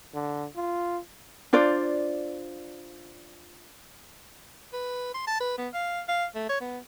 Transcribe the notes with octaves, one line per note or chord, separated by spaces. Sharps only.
D3
F4
D4 F4 C5 D5
B4
C6
A5
B4
B3
F5
F5
A3
C#5
B3